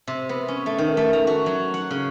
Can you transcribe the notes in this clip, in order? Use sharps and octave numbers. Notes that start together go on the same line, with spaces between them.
C3
B3
C#4
A3
D#3
A3
A#5
F#4
F#3
F#5
C#3